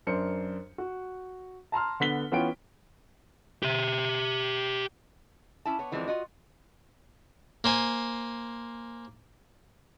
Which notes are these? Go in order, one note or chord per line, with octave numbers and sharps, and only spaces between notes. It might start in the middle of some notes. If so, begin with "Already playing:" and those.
F#2 D4 A#4 C5 C#7
F#4
A5 A#5 C6 F6
D3 B3 B6 G7
E3 B3 C#4 F4 G5 D7
G4 E5
C#4 E4 A5
B3 C#5
D3 E3 F3 G#3 C4 D4
F4 F#4 D#5
A#3 C5 G#5